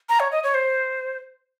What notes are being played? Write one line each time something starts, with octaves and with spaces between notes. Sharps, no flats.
A#5
C#5
D#5
C#5
C5